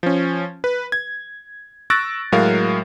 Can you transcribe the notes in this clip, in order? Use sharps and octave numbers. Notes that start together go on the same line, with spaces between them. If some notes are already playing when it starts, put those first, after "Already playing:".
F3 C#4
B4
G#6
C#6 E6 F#6 A6 A#6 D7
A2 F#3 G#3 A#4 F5